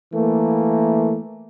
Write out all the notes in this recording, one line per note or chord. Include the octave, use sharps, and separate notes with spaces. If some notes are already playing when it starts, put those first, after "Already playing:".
E3 A3 A#3